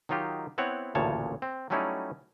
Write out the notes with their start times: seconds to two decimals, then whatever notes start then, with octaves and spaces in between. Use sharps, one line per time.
0.09 D#3 F#3 D#4 F4 G4
0.58 B3 C4 E4 C#5 F#5
0.95 A1 D2 A#2 C#3 C#5 A5
1.42 C4
1.70 F#3 G3 A3 C#4 D#4 E4